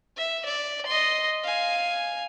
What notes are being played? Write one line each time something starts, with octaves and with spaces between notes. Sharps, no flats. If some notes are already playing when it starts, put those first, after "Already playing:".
E5
D5
D#5 C6
F5 G#5